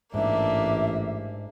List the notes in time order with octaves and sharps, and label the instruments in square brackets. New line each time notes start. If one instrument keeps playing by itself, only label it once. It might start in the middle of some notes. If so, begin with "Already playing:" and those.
[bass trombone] A1 [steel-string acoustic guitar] G#2 [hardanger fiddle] A#3 D4 [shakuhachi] E5